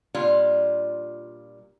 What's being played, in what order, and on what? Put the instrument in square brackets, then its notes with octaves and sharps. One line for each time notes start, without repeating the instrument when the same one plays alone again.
[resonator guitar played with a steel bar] A#2 G3 D4 F4